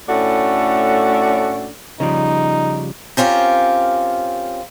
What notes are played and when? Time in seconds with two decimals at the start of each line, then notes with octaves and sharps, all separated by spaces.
0.09 A2 A3 C#4 D4 F#4 A4
2.00 C#3 F3 G3 D#4
3.17 C4 C#4 F4 G4 A#4